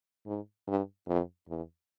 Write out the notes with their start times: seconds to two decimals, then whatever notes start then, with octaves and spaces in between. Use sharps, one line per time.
0.26 G#2
0.67 G2
1.07 F2
1.48 E2